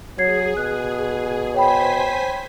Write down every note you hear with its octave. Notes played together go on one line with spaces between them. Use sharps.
F#3 G#4 C#5 G#6 C7
B2 F#6
C5 C#5 G5 G#5 B5 B6